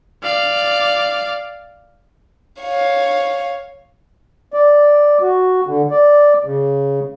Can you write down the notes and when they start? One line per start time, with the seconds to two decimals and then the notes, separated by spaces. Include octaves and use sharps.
0.23 D5 F5
2.62 C#5 F5
4.53 D5
5.22 F#4
5.67 D3
5.91 D5
6.45 C#3